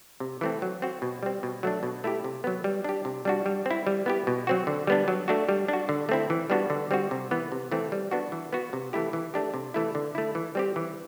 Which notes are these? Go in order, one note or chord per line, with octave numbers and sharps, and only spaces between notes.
C3
E3 A3 C4
F#3
C4 F#4
B2
G3 C4
B2
F#3 A3 D4
B2
A3 E4 G4
C3
F#3 B3
G3
D4 G4
C3
G3 D4 F#4
G3
C4 E4
G3
B3 E4 G4
B2
F#3 C4 F#4
D3
G3 B3 D4
F#3
A3 D4 F#4
G3
D4 F#4
D3
A3 C4 E4
E3
G3 B3 D4 F#4
D3
G3 C4 F#4
C3
E3 B3
C3
E3 A3 C4
G3
B3 D4 F#4
E3
B3 F#4
C3
E3 A3 E4 G4
E3
A3 D4 G4
C3
E3 A3 E4
D3
A3 E4
E3
G3 C4 G4
E3